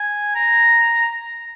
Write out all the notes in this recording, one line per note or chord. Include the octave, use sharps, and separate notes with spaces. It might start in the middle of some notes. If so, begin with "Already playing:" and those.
Already playing: G#5
A#5